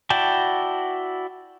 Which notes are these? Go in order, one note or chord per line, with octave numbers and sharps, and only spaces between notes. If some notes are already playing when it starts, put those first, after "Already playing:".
E4 F#4 D5 G5 A5